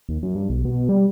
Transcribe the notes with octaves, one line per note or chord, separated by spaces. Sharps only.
D#2
F#2
G2
B1
B2
G3